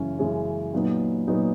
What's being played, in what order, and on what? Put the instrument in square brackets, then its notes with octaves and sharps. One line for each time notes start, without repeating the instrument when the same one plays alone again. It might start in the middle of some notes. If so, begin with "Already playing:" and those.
Already playing: [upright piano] F#2 C#3 E3 G#3 C#4
F#2 C#3 E3 G#3 C#4
A#2 F#3 B3 D#4
A#2 F#3 B3 D#4